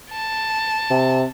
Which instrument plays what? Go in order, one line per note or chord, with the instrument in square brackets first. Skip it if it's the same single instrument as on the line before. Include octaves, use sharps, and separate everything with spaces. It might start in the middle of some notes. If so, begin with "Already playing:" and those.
[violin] A5
[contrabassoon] C3